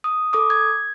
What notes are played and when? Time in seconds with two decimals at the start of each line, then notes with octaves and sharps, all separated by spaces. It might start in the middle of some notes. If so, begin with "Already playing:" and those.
0.04 D#6
0.33 A4 D6 D#6
0.50 G#6